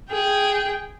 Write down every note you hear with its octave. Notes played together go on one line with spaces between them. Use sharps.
G#4 G5